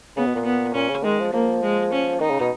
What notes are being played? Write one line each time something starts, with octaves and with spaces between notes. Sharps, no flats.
C#3 B3
B2
A#2
B3
A#2 C#4
C#3
D#3 G#3
F3
F3 A#3
G#3
C#4
D#3 D#4
C#3
B2